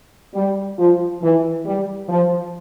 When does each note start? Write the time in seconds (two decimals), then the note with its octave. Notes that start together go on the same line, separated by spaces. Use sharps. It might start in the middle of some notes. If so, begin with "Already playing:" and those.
0.34 G3
0.78 F3
1.22 E3
1.66 G3
2.09 F3